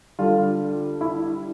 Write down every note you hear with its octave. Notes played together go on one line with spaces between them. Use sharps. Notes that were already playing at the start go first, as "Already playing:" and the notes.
D3 G3 F4
E4